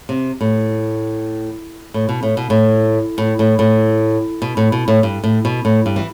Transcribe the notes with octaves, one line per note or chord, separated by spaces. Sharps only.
C3
A2
A2
B2
A2
B2
A2
A2
A2
A2
B2
A2
B2
A2
G2
A2
B2
A2
G2
E3